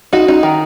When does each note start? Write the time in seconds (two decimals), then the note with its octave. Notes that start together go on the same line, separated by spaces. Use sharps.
0.13 D#4 F#4
0.28 D#4
0.43 D#3